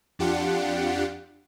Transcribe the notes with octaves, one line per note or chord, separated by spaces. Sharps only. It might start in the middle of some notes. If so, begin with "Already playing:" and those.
F2 D4 F4 G4 F#5 C#7